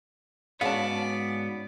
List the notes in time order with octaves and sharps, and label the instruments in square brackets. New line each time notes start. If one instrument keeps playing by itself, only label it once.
[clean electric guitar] G#2 B3 [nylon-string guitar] C#4 F#4 G#4 [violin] D5 [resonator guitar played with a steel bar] F5 A5